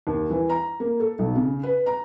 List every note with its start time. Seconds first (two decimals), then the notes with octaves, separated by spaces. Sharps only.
0.07 D#2
0.30 E3
0.49 A#5
0.80 A#3
1.00 A4
1.19 B1
1.35 C#3
1.63 B4
1.86 A#5